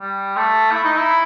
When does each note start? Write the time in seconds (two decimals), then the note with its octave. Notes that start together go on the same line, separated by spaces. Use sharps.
0.01 G3
0.36 A3
0.72 E4
0.84 D#4
0.98 E4